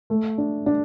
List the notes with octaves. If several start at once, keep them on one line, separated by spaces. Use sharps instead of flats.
A3
D4
D4